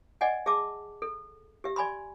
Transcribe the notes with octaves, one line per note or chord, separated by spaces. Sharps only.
D5 D#5 F#5 G#5
G#4 E5 A5 D6
A4
G4 E5
D5 G#5 B5 C6